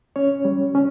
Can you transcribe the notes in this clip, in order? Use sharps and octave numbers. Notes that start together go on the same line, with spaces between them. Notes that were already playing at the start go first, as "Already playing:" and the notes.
C#4 C#5
G3
C#4